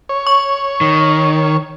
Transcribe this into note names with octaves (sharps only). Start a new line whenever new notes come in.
C#5
C#6
D#3